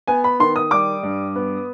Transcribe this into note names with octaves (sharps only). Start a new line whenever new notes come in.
B3 G#5
B5
D#3 C6
D#6
G3 D6
G2
B3